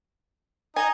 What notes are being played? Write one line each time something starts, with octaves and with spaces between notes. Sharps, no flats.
D#4 G#5